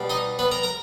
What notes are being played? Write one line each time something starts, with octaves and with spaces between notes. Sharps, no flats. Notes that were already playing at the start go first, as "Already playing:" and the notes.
Already playing: B2 G3
D#4 D#5
B3 B4
A#4 A#5
A#4 A#5